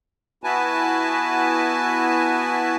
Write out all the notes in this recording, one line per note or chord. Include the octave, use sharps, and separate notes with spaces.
B3 E4 F#4 B4 G#5 A5